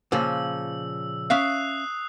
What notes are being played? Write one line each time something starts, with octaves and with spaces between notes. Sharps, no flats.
A#2 C#3 F3 E6
C#4 E5 F5 D#6 F#6 C7